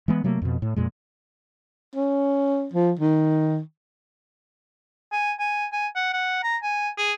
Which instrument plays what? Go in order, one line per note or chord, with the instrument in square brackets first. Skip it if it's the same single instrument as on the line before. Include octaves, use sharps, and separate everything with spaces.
[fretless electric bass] E3 G#3 B3
C3 F#3 A3 A#3
F2 B2
A2
F2 A#2 G#3
[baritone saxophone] C#4
F3
D#3
[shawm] G#5
G#5
G#5
F#5
F#5
A#5
G#5
G#4